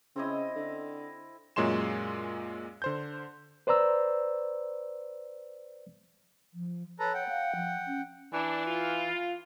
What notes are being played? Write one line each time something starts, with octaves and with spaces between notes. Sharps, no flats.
C#3 C4 E4 D#5
D3
F#2 A#2 G#3 C#5 C6 E7
D3 C5 G6
B4 C5 D5 A#5 E6
F3
A4 B4 C#5 A#5
F#5 G5
F5
F3
C#4
E3 D4
F4